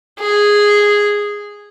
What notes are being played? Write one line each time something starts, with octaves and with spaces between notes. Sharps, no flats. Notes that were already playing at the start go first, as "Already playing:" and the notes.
G#4